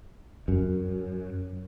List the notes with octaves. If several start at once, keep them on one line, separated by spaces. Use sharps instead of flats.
F#2